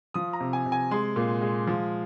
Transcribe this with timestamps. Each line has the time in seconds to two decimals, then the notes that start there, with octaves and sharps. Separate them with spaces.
0.14 F3 D#6
0.33 A#5
0.40 C3
0.53 G#5
0.66 C3
0.72 G#5
0.91 G#3 C6
1.16 A#2
1.41 G#3
1.67 F3